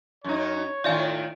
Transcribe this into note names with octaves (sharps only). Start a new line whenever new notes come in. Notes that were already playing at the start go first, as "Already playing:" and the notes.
F#2 D#4 C#5
A2 D#3 F4 D5 E5 G#5